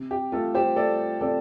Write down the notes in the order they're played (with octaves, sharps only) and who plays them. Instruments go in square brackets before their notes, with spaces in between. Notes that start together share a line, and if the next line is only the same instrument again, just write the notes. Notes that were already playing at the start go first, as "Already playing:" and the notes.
Already playing: [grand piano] C3
G4
A3 F4 A4
G4 C5
A3 A4 D5
C3 A4 D5